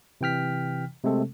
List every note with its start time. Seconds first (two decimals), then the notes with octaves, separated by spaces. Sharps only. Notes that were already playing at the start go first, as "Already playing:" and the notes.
0.21 C3 E3 G5 F6 B6
1.04 C3 G#3 A3 C4 A4